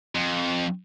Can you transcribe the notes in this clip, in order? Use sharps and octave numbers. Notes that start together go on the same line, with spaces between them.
F2